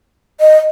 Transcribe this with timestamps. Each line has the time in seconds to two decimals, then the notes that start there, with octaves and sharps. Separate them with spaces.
0.41 D#5